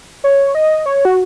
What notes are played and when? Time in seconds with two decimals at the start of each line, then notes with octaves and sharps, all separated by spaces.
0.24 C#5
0.55 D#5
0.86 C#5
1.05 F#4